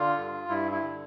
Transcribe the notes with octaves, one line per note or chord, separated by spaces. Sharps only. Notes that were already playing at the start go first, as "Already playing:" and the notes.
Already playing: D3 F4
G2
G2 E4
E4
D3